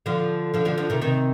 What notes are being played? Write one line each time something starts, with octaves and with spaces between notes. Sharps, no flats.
D3 F3
D3 F3
D3 F3
D3 F3
C3 D#3
C3 D#3